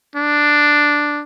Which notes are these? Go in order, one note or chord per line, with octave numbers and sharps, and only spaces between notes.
D4